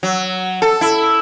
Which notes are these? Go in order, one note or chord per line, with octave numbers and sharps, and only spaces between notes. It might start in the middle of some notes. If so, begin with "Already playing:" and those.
F#3
A4
E4